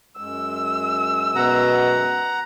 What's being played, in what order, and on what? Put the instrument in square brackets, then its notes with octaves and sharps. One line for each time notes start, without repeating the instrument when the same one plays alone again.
[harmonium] F#2 G#3 [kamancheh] E6
[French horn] B2 [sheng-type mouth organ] F#5 A#5